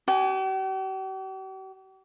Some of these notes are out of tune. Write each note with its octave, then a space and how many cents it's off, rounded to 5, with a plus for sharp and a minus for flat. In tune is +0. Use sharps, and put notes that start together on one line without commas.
G4 -45 G#5 +0